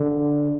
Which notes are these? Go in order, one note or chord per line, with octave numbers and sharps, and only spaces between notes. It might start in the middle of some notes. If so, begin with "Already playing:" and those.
Already playing: D3